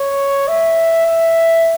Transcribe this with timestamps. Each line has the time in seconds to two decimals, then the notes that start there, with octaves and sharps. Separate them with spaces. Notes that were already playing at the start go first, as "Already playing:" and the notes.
Already playing: C#5
0.48 E5
1.06 E5